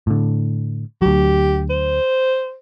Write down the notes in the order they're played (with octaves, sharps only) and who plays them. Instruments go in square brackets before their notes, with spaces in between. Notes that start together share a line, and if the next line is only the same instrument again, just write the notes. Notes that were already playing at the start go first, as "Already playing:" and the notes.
[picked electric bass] A2 D3
[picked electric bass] D2 F#3 [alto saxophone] G4
[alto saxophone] C5